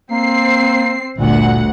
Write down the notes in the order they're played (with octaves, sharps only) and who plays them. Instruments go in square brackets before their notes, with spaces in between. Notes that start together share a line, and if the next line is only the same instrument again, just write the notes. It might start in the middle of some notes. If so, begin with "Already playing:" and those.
[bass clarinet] A#3 [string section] C4 C7
[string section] G1 D2 F#5 [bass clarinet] A#2